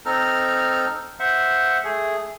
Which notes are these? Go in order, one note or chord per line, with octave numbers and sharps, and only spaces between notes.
C4 D#4 A4 A#5 F6
C5 E5 F#5
A3 G#4